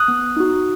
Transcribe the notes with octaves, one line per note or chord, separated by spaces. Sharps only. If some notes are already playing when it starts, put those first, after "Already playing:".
Already playing: D#6 F#6
B3
D#4 F#4